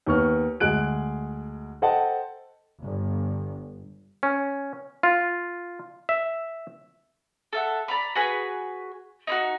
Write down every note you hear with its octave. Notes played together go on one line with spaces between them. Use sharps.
D#2 B3 C#6 F6
D2 G#3 G#4 F#6 D7
A4 C5 D#5 F#5 G5 A5
G1
C#4
F4
E5
A4 E5 F#5
D5 A#5 B5
F#4 G#4 B4
D#4 E4 F#4